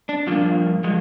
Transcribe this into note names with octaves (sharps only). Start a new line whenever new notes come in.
D4
G2 F3 A#3 D4 F4
F3 G#3